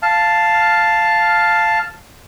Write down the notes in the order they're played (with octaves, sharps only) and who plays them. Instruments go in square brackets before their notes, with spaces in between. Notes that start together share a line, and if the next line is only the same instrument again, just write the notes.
[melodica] F5 A5